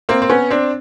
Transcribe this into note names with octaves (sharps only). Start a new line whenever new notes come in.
A#3 C4
C4
B3 C#4
C4 D4